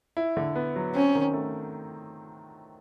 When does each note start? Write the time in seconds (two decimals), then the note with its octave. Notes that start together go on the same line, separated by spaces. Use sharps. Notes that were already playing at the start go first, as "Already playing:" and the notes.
0.17 E4
0.37 D3
0.55 B3
0.76 F#3
0.95 C4 C#4
1.15 D#3
1.34 A3